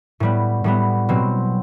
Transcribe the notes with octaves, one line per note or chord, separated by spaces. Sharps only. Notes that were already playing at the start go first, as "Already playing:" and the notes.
A2 G3 B3
A2 G3 B3
B2 F#3 C4